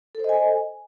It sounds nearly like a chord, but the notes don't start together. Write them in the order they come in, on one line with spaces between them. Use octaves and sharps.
A4 C5 D#5 G#5